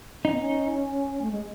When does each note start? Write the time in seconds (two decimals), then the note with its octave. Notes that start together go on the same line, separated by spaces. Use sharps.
0.25 C#4 D#4
0.33 B3
0.41 C#4
1.21 A3
1.31 G#3